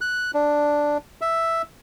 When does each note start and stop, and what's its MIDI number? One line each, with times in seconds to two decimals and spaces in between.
0.01 0.31 90
0.34 0.98 62
1.21 1.62 76